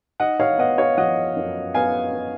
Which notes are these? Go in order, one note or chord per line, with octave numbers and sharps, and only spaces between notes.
D#4 D#5 F#5
C#5 F5
B3 D#5 F#5
C#5 F5
F3 D#5 F#5
F#2
B3 F5 G#5
B3